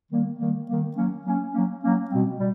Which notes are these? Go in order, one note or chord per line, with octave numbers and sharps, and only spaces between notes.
D#3 G3 A#3
D#3 G3 A#3
D#3 G3 A#3
F#3 A#3 C#4
F#3 A#3 C#4
F#3 A#3 C#4
F#3 A#3 C#4
B2 G3 C4
B2 G3